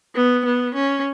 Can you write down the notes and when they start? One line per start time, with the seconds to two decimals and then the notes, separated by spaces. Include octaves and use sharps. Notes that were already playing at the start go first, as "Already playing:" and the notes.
0.15 B3
0.45 B3
0.75 C#4